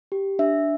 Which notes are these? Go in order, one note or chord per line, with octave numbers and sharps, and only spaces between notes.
G4
D4 E5